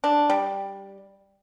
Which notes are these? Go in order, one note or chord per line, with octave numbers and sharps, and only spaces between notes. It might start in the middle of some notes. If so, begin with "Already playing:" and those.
D4
G3